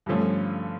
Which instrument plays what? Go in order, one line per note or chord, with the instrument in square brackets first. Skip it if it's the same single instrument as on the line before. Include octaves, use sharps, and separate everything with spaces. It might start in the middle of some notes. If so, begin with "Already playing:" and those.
[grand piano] G2 D3 F3 A3 C#4